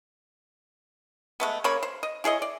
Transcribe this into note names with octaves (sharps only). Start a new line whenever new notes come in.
G#3 A3 B3
C#3 A#3 C#5 B5
C5
D#5
E4 G#4 C#5 D#5
D5